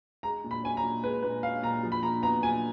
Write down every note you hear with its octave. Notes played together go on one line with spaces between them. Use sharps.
G#3 A#5
A#2
B5
C#4 G#5
A#5
A#2
G#3 B4
A#2 B4
C#4 F5
A#2 A#5
F3
B5
A#2 A#5
B3 A#5
A#2 G#5